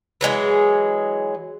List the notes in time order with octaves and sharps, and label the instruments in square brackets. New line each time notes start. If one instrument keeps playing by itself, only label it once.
[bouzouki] E3 F#3 G#3 G#4